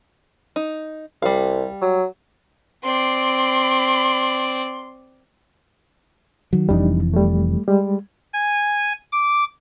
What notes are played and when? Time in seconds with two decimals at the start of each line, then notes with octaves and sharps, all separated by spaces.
0.56 D#4
1.22 C2 G3 F5
1.81 F#3
2.84 C4 D5 C6
6.53 D#3 F#3
6.69 F1 F2 E3 G3 D4 D#4
7.14 G3 A3
7.68 G3 G#3
8.33 G#5
9.12 D6